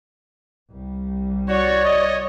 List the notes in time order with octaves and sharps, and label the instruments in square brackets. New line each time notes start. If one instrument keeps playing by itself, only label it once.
[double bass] C2 G3
[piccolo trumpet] F#4 [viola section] C#5 [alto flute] D5
[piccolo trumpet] D#5